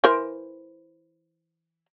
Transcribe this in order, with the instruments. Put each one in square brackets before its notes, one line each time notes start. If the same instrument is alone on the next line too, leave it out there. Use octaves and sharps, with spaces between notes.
[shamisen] E3 A#4 C5